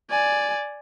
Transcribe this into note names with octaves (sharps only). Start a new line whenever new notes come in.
D5 G#5